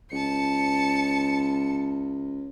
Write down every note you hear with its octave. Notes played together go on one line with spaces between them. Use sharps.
C#2 A5 C#7